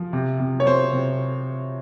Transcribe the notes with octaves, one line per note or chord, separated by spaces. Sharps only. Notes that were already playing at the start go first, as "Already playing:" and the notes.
Already playing: F3
C3
C3
C#5
C3 C5
C3